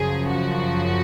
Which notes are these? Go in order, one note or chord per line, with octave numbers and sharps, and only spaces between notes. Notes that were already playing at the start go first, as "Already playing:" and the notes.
Already playing: F#2 C#3 F3 G#4
F#4